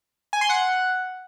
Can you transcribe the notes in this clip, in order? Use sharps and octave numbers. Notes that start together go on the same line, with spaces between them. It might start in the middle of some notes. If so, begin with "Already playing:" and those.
G#5
C6
F#5